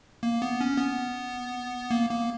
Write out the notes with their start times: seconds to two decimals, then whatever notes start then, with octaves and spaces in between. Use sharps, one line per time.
0.23 A#3
0.42 B3
0.61 C#4
0.78 B3
1.91 A#3
2.09 A#3